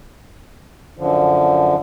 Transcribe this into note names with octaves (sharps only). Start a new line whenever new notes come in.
F#2 D3 F3